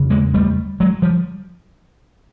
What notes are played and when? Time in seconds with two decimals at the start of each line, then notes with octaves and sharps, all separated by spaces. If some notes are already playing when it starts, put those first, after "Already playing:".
Already playing: E2 C#3
0.10 G#3 A#3
0.34 G3 A3
0.80 F#3 G#3
1.02 F3 G3